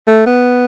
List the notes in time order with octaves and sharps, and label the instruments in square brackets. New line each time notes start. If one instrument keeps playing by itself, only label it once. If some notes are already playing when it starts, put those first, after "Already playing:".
[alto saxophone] A3
B3